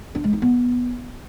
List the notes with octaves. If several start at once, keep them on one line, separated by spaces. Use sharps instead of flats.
D4
G#3
D#4
B3